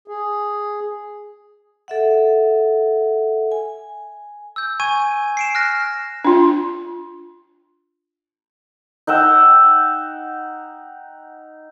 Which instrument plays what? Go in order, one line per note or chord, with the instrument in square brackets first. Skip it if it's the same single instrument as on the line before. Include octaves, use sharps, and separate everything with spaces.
[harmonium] G#4
[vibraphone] A4 E5 F#5
G#5
[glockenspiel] E6 G6
G#5 C#6 G#6 D#7
C7 D7 E7
F6 F#6 A#6
[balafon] D4 F4
[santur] D#4 F#5 G5 E6